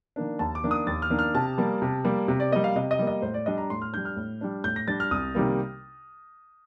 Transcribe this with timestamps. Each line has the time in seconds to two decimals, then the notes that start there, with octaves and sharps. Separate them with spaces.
0.16 D#3 A#3 D4
0.39 D#2 A5
0.55 D6
0.64 D#3 A#3 D4
0.71 D#6
0.87 D#2 A6
1.02 F6
1.10 D#3 A#3 D4
1.19 F6
1.34 C3 A5
1.58 G3 A#3
1.82 C3
2.05 G3 A#3
2.28 C3
2.40 D5
2.51 G3 A#3 D#5
2.64 F5
2.76 C3 D#5
2.91 D#5
2.99 G3 A#3
3.07 D#5
3.22 A2 C5
3.34 D5
3.46 G3 D4 D#5
3.58 A#5
3.70 A2 C6
3.82 F6
3.93 G3 D4 G6
4.05 F6
4.16 A2
4.41 G3 D4
4.64 A2 G6
4.76 A#6
4.88 G3 D4 A6
5.00 F6
5.11 C2 D#6
5.35 C3 D#3 G3 A#3